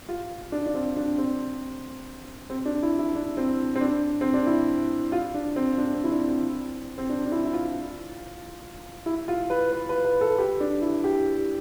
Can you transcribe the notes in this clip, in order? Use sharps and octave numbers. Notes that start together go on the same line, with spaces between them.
F4
D4
D4
C4
D4
C4
C4
D4
E4
E4
D4
C4
C4
D4
C4
D4
E4
F4
D4
C4
D4
C4
E4
D4
C4
C4
D4
D4
E4
E4
F4
E4
F4
B4
B4
B4
B4
A4
G4
D4
E4
G4